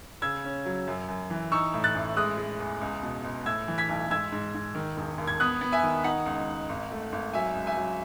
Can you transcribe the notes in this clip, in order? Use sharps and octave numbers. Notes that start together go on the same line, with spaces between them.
C#3 E6 G#6
C#4
F#3
F#2
F#2
E3
D#4 C#6 E6
A2
F#6 A6
A1
G#3 D#6 F#6
G#3
E2
C#2
B2
C#2
A2 E6 G#6
E3
G#6 B6
B1
G#2 E6 G#6
G#2
G#2
D#3
E1
D#2
G#6
B3 D#6 F#6
B3
E5 G#5
D#3
D#4 F#5
C#2
D#4
G#1
A3
G#1
F#3 E5 G#5
C#2
E5 G#5
F#3